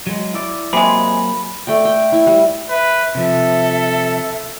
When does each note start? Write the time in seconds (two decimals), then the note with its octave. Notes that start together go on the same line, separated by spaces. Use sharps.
0.07 F#3 G#3
0.34 E4 D5
0.73 C3 F#3 G#3 A#3 G#4 B5
1.67 A3 D5 G5
1.85 G5
2.12 E4
2.27 G3
2.70 B4 E5
3.15 C3 F3 A4 E5